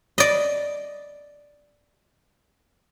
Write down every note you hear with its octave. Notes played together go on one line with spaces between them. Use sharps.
D5 D#5